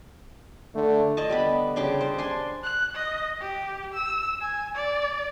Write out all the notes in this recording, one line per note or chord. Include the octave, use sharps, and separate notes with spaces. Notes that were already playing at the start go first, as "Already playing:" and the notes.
D3 A3
D3 D#5 A5
G3 B3 B5
C#3 G3 D4 C6
C5
D4 G#5 C6
F#6
D#5
G4
E6
G#5
D5